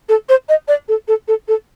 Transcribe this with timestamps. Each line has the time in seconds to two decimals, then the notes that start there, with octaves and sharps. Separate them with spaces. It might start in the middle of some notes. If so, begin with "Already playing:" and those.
0.09 A4
0.29 C5
0.49 D#5
0.68 D5
0.88 A4
1.08 A4
1.28 A4
1.48 A4